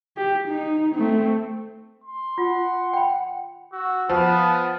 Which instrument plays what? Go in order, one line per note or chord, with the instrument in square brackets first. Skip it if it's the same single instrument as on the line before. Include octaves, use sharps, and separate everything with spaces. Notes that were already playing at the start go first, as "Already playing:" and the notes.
[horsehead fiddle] G4
D#4
A3 C4
[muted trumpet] C6
[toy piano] F4 [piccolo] F#5
[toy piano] G5 B5
[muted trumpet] F#4 [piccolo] E6
[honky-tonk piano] F3 [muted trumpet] B3 [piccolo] A5